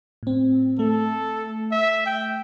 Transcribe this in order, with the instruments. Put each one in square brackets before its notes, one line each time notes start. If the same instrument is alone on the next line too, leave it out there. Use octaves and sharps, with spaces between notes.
[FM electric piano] A2 C4
[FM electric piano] A3 [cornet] A4
[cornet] E5
G5